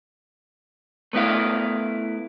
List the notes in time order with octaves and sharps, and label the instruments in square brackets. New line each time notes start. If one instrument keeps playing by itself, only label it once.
[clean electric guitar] A3 B3 E4 F5